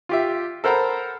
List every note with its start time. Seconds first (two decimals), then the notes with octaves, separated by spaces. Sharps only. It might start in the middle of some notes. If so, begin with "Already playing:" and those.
0.09 F4 G4 E5
0.64 A4 A#4 C5 F#5 A#5 B5